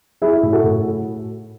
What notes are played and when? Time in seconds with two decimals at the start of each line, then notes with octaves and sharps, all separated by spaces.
0.22 F#3 E4 G#4
0.43 A2
0.53 F#4 A4
0.64 A2